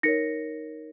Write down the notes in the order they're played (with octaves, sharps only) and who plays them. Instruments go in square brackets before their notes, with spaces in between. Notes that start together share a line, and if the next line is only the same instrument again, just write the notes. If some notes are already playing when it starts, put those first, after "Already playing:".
[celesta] D#4 A#4 C#5 A#6 C#7